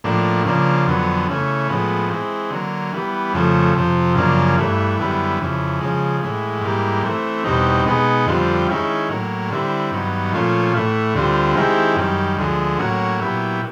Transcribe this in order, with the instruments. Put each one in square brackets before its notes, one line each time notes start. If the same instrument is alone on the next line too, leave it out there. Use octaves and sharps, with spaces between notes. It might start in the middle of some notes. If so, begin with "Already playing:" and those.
[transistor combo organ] A2 F3 A#3 D4
C#3 F3 A#3 D4
F2 D3 F#3 B3
C#3 E3 A3 C#4
A2 F3 G#3 B3
E3 G#3 C4
D3 F#3 A#3
E3 G3 B3
F2 C#3 F3 A3
F2 C3 F3
F#2 C#3 F3 A#3 D4
G2 E3 A3
F#2 D3 G3 B3 E4
F2 C#3 E3
C#3 F3 G#3
A2 E3 G#3
G#2 E3 G3 A#3
E3 A3 C4
E2 B2 G3 C4 D#4
B2 G#3 B3 D#4
F2 D3 G3 C4 F4
D#3 G#3 C#4 E4
A2 F#3 A#3
D3 G3 C4 E4
G2 D#3 F#3 B3
A#2 F3 A3 C#4 F4
A2 E3 A3
D2 D3 G3 C4 F4
D#3 G#3 C4 E4 G4
F#2 D#3 G3
D2 D3 F3 G#3
A2 F#3 A#3 C#4 F#4
A#2 F#3 B3 E4 G4